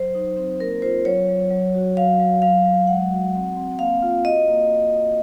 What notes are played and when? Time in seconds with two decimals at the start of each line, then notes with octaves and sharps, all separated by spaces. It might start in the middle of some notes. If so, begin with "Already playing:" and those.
Already playing: F#3 C5
0.15 D#4
0.37 C4
0.60 A#3 A#4
0.82 F4 C5
1.05 F#3 C#5
1.29 F#3
1.51 F#3
1.74 F#4
1.97 F#3 F5
2.20 F#3
2.42 F#3 F5
2.65 F#3
2.87 G#3 F#5
3.11 F#4
3.34 C4
3.56 C4
3.79 A#3 F5
4.02 F4
4.25 F#4 D#5
4.48 A#3